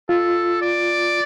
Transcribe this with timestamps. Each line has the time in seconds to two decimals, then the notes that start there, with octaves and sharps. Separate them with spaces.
0.09 F4 A4
0.62 D5